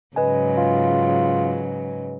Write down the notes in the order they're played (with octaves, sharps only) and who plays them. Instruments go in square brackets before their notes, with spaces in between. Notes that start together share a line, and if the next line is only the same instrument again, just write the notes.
[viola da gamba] G#2 C#3 F#3 [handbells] B4 D#5 G#5
[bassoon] F4